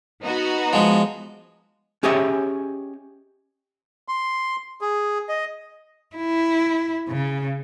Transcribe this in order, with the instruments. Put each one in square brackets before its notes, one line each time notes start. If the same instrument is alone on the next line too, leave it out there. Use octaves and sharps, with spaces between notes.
[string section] B3 D#4 F#4
[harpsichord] F3 G#3
[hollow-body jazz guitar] C#4 G4 G#4 C#5 D#5 E5
[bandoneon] C6
G#4
D#5
[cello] E4
C#3